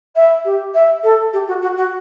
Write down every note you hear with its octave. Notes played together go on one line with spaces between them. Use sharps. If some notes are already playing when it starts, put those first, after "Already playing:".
E5
G4
E5
A4
G4
F#4
F#4
F#4